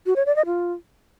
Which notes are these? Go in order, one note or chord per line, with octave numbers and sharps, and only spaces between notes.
F#4
C#5
D5
D#5
F4